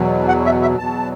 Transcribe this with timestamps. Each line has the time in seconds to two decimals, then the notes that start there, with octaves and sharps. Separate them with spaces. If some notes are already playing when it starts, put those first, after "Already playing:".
Already playing: E2 B2 F#3
0.28 F#5
0.45 E5
0.62 E5
0.78 E2 B2 F#3 A5